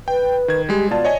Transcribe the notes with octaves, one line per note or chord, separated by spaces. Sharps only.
B4 G5
D#3 G#6
G3 G#3 G4
B2 F4 D5 A5
C#5 D#5 G#5